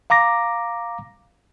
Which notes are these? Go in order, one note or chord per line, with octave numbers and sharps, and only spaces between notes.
F5 A#5 D6 A#6